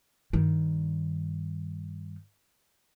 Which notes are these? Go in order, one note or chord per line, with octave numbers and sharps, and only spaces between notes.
G2 D#3